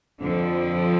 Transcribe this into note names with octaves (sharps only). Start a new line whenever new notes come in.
F2 D3 F3